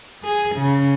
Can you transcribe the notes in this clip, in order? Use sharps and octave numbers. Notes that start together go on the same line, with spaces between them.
G#4
C#3